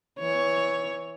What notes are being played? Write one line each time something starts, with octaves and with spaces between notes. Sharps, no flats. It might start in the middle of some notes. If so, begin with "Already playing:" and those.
E3 C#5